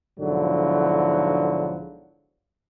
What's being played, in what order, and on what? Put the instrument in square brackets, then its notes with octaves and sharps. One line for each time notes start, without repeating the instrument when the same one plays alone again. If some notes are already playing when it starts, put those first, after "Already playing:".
[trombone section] B1 G#2 D3 F3 F#3 E4